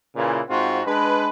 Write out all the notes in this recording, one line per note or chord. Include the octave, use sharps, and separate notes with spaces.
A#2 C#3 E3
G#2 C4 F4 F#4
G#3 D4 B4